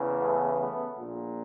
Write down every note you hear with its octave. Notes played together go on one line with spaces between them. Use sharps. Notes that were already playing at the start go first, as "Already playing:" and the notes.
Already playing: E2 C#3 E3
A3 B3
A3 B3
A#1 A#2